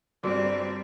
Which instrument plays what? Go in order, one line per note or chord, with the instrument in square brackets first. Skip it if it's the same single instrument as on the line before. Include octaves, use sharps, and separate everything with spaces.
[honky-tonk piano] G1 [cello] G3 C4 [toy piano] F#4 G#4 A#4 [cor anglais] D5